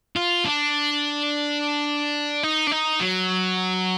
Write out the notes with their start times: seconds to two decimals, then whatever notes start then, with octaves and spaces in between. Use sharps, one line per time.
0.16 F4
0.45 D4
2.43 D#4
2.67 D4
2.71 D#4
3.00 F#3